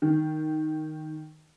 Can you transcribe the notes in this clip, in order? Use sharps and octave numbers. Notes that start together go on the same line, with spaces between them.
D#3